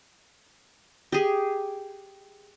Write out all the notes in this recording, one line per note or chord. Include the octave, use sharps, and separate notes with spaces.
G4 G#4